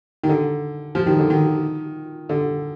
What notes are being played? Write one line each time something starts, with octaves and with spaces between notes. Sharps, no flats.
D#3
D3
F3
D#3
D3
D#3
D3